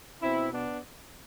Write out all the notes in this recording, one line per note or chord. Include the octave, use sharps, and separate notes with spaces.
B2 C4 E4
B3 D4